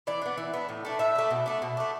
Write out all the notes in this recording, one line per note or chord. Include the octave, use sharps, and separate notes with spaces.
E3 D5
B3 D4
E3
B3 D4
A2
A3 D4
A2 E5
A3 D4
B2
A3 D4
B2
A3 D4